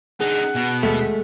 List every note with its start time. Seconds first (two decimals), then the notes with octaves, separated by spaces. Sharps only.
0.20 D3 D#4 G#4 F#5
0.55 B2
0.83 D#2 G#3 A3 B6